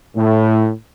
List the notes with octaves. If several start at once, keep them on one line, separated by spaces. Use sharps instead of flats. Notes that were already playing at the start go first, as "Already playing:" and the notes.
A2